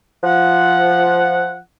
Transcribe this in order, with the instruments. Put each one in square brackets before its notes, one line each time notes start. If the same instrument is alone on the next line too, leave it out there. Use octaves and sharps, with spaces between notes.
[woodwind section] F3 F#5